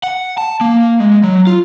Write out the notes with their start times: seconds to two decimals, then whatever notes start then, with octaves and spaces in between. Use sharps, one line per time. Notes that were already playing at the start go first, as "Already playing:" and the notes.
0.03 F#5
0.38 A5
0.61 A#3
1.00 G#3
1.24 F#3
1.47 F4